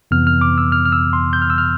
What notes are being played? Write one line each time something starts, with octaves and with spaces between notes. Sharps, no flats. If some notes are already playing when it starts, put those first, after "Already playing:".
F2 C3 E3 B3 F6
F6
D6
E6
F6
F6
E6
C6
G6
F6
E6
F6